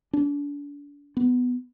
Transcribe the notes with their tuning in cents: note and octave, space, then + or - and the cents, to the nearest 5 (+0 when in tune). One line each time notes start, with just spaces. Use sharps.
D4 -35
B3 +10